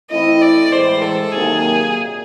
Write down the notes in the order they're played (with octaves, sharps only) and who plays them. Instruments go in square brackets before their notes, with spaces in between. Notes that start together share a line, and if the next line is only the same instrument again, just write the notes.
[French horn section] E3 A3 C4 E4 [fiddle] D#5
[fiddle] D5
[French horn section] A2 E3 G#3 [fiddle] C5
[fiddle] A4
[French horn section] C3 D#3 F#3 A#3 [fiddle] G#4
[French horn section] A#2